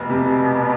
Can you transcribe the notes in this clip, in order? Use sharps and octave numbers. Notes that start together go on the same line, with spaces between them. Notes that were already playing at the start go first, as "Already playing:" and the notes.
Already playing: F1 B2
C3